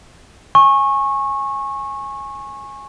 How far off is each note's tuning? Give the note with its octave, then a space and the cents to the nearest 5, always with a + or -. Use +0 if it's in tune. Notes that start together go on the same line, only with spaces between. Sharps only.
G#5 +0 C#6 -20